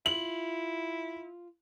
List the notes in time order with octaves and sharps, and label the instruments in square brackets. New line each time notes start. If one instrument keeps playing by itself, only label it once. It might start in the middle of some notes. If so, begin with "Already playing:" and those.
[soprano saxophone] E4 [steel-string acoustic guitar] F4 [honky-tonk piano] F#7